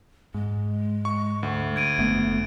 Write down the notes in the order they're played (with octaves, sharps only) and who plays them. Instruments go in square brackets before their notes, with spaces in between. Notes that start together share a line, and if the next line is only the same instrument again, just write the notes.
[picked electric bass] G#2 [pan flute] G#3
[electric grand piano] C#6
D2
[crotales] G#6 D7 D#7
[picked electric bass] F#1 A3 B3